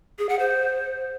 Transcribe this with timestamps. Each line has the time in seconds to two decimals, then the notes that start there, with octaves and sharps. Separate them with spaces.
0.19 G#4
0.29 F#5
0.39 C5